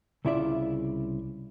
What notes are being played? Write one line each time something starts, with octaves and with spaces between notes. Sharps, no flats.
C2 C#3 E4 F4 D5 E5